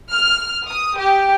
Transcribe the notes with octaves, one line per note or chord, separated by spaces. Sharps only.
F6
D#6
G4